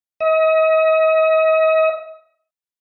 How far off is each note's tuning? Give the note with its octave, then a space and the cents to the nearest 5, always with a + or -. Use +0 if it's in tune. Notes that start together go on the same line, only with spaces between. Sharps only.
D#5 +40